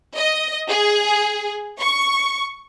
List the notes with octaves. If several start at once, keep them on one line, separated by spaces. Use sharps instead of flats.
D#5
G#4
C#6